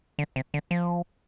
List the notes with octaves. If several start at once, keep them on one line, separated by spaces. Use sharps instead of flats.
D3
C3
D3
F3